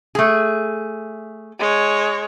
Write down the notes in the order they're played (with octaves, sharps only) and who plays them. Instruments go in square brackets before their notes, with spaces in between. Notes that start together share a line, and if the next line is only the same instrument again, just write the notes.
[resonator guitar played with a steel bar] A3 G#4
[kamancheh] G#3 C#5